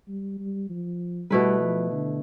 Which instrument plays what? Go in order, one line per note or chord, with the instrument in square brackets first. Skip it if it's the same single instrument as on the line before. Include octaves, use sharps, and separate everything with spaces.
[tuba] G3
G3
F3
[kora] B2 A3 E4 B4 [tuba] G3
[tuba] F3
D3